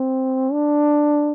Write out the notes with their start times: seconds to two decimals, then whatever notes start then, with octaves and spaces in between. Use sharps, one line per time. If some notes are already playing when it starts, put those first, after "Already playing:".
Already playing: C4
0.53 D4